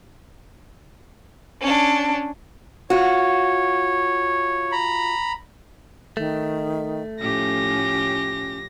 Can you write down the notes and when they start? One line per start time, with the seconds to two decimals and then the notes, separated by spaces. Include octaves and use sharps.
1.61 C#4 D4
2.90 F4 F#4 C#5
4.72 A#5 B5
6.17 D#3 A3
7.21 A2 F3 C#4 G4 A#6